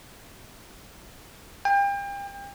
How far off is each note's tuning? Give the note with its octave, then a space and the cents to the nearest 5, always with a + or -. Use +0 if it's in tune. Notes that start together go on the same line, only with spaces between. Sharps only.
G5 +35